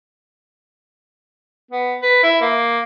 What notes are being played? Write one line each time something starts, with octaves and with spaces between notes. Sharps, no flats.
B3
B4
E4
A#3